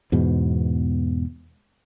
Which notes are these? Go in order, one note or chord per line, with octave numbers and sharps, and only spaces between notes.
E2 G#2 B2